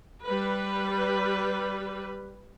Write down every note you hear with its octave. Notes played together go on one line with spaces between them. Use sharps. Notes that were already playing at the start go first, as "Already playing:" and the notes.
G3 B4